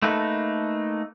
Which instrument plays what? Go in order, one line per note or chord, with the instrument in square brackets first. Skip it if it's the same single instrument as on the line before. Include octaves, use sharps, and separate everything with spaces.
[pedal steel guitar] A3 A#3 D#4 A4 B4